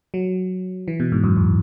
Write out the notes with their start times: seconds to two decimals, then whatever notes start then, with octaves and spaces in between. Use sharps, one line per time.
0.14 F#3
0.88 E3
1.00 B2
1.12 G#2
1.24 F#2
1.37 E2